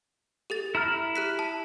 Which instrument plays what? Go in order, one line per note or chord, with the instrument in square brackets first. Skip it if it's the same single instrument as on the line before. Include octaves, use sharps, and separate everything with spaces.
[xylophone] G4 A4 A6
[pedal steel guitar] E4 A#5 F6
[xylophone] G4 F#6 B6
A5